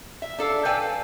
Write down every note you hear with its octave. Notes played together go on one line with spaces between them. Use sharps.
E5
D4 A4 F5
A4 B4 D5 F5 G5 G#5